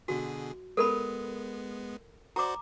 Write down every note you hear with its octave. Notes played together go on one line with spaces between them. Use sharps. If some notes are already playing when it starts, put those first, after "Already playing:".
B2 D3 F#4 G#4
G#3 B3 A4 A#4 B5
F#4 C5 D5 A#5 D6